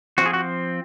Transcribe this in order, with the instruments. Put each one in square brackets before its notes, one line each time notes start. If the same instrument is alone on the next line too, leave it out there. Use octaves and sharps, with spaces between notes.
[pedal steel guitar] F3 C4 F#4
G#4
F#4